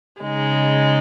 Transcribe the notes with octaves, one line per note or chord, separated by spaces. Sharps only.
C#3 G#3 D#4